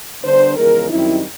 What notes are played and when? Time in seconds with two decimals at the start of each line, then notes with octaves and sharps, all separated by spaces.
0.23 D3 G3 B3 D4 C5
0.57 E2 C#3 F3 G#3 A#4
0.90 F#2 D#3 G3 C4 D#4 E4